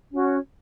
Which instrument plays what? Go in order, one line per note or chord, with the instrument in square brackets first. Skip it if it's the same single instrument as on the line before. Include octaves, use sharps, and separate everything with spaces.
[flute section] C#4 F#4 C#5